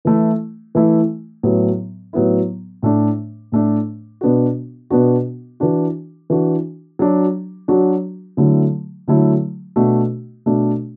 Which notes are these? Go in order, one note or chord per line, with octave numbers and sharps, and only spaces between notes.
E3 A3 E4
E3 A3 E4
A2 F#3 B3 E4
A2 F#3 B3 E4
A2 A3 D4
A2 A3 D4
B2 B3 D4 F#4
B2 B3 D4 F#4
E3 D4 F#4
E3 D4 F#4
F#3 D4 F#4
F#3 D4 F#4
D3 F#3 A3 E4
D3 F#3 A3 E4
B2 A3 D4 F#4
B2 A3 D4 F#4